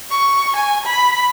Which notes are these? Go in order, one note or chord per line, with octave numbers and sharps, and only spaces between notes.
C#6
G#5
B5